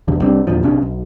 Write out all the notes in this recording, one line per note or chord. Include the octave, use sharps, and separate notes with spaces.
F1 B1 E2 D3
C2 G3 C4 D4
E2 A#2 D3 F3
B1 C3 C#4 D4
B1